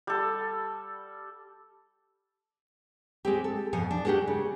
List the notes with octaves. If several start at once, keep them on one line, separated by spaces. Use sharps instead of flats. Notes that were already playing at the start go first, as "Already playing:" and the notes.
G3 A4
G#3 C4 G4
A4
F2 B2 F3 F#5 G#5
D4
G#3 B3 D4 F#4 G4 A4
C#3